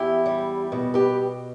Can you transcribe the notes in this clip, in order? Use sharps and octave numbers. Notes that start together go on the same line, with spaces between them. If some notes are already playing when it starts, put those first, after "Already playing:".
Already playing: E2 E4 G4
G3
B2
G4 B4